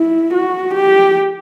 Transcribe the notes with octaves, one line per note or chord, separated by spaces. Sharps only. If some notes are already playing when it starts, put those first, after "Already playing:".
Already playing: E4
F#4
G4